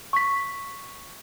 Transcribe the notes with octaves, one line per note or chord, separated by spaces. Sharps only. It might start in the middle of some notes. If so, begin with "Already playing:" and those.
C#6 B6